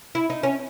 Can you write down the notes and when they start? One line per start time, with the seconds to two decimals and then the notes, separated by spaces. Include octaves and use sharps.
0.15 E4
0.30 D#4
0.43 C#4